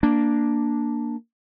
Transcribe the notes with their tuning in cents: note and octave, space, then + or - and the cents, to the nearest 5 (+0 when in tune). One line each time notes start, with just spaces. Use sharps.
A#3 +0 D4 +0